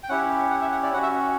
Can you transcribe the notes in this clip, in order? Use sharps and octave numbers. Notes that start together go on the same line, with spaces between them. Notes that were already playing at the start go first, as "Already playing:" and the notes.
G5
C#4 E4 G4 F#5
F#5
E5
F#5
D5
C#4 F#4 F#5
E5